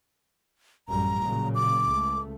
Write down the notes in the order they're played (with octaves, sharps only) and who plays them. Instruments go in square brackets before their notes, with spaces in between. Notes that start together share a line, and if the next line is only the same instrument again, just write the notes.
[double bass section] A1 F#2 G3 [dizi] A#5
[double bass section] A#2 C#3 F#3
[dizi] D6
[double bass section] C#2 A3